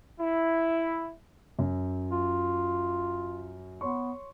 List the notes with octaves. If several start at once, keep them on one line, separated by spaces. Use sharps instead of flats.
E4
F#2 F#3
F4
B3 C#5 C6 C#6